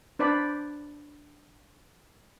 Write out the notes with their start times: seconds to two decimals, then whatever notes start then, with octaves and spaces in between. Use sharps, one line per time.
0.19 D4 B4 C5 D5 B5